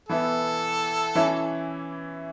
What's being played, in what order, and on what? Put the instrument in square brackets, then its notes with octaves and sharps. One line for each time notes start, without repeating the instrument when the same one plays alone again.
[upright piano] E3 B3 E4 [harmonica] A4
[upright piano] E3 C#4 E4